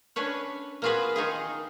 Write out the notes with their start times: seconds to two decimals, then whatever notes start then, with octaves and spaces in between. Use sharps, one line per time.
0.16 C#4 D4 B4 C#5
0.82 A#3 B3 F4 F#4 G#4 B4
1.16 D#3 D#4 F4 G#4